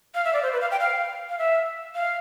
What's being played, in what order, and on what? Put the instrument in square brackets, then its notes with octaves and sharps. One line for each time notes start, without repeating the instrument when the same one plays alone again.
[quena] F5
E5
D5
C5
B4
F5
G5
F5
F5
E5
F5